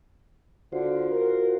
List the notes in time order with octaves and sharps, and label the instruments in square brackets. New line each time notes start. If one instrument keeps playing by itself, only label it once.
[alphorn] D3 [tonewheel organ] F4 F#4 C5
[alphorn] A#4